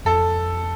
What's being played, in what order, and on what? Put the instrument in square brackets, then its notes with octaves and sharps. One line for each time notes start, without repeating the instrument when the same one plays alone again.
[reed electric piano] F2 [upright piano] A4